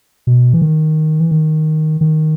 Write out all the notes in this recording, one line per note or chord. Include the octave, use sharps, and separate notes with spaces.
B2
E3
D#3
E3
D#3
D#3